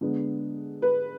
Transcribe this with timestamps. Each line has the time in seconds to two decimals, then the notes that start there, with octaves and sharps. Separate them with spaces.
0.01 D3 G#3 B3
0.82 B4